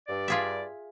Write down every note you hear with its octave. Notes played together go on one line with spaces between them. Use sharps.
G2 D5
F4 G#4 E5